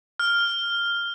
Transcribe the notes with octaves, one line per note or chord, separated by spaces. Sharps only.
F6